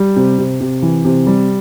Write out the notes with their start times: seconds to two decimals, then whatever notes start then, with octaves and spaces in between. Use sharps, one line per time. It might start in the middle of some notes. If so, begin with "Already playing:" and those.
Already playing: G3
0.16 C3
0.38 C3
0.60 C3
0.82 E3
1.05 C3
1.27 G3